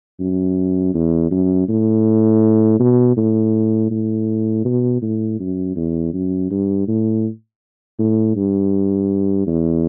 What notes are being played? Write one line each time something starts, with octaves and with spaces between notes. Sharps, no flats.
F#2
E2
F#2
A2
B2
A2
A2
B2
A2
F#2
E2
F#2
G2
A2
A2
G2
E2